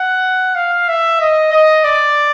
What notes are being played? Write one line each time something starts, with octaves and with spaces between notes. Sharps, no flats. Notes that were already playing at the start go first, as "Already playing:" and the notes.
Already playing: F#5
F5
E5
D#5
D#5
D5